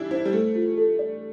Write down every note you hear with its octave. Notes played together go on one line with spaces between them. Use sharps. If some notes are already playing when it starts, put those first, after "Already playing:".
Already playing: E3 G3 D4 E4
E4 C5
G3
A3 A4
F4
A4
D5